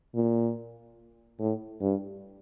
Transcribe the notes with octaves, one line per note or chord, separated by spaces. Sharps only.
A#2
A2
G2